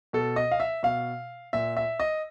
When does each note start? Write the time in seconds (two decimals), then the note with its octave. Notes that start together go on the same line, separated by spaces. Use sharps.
0.13 B2 A4
0.36 D#5
0.51 F5
0.60 E5
0.83 B2 F5
1.53 A#2 E5
1.77 E5
2.00 D#5